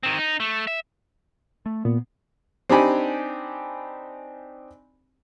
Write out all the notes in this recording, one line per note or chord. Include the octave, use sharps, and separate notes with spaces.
D#3 C4
D#4
A3
E5
A3
A#2 B3
C4 D4 D#4 G4 G#5 B5